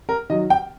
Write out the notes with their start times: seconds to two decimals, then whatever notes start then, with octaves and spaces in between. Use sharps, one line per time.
0.09 A#4
0.30 D#3 F#3 D#5
0.50 G5